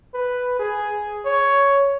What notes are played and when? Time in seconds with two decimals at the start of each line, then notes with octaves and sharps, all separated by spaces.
0.14 B4
0.59 G#4
1.25 C#5